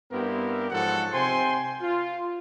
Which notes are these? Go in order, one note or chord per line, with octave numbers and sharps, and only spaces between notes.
G2 B3 C4 E4 G4 A#4
G#2 F3 F#3 G#3 A4 F#5
C3 C5 G5 G#5 C6
F4